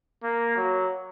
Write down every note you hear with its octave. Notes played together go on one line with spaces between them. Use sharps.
A#3
F#3